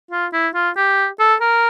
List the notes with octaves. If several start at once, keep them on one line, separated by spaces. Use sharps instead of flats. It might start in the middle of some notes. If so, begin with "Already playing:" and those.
F4
E4
F4
G4
A4
A#4